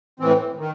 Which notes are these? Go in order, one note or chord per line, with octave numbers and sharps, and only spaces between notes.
A2 E3 C4
D#3